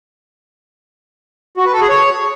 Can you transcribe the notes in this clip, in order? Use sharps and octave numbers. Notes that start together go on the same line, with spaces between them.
F#4
B4
A4
G#4
C#5